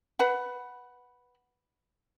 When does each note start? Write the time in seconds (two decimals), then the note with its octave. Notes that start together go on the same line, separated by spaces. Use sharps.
0.19 B4 F#5 B5